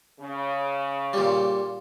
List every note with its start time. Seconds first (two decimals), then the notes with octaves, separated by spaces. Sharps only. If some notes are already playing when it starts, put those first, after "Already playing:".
0.21 C#3
1.13 A#2 G3